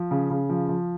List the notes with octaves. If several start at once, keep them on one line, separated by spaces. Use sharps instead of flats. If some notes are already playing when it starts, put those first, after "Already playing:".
Already playing: F3
C#3
C#3
F3
F3